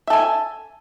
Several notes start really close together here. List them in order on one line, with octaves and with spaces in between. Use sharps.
E5 A4 G#5